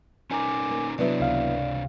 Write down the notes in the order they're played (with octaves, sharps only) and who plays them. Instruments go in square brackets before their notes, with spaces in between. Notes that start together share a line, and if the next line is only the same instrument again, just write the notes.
[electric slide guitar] C#4 D#4 A#4 [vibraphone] G#5 A#5 D6
[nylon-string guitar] A#3
[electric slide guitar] C3 D4 [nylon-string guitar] F#3 B3 E4 [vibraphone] D5
[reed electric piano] C#2 F5